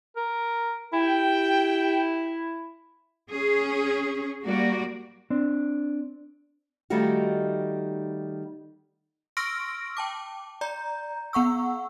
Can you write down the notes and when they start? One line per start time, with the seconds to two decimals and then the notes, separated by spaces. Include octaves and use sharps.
0.16 A#4
0.93 E4 G4 G5
3.30 C#4 G#4
4.44 G3 A#3 F#4 D5
5.30 C4 D4
6.90 D#3 G3 A3 D#4 F4 F#4
9.37 C6 C#6 E6 F6 A#6 D7
9.97 G5 A5 D6
10.61 D5 A#5 G6
11.33 B3 F#5 C#6 E6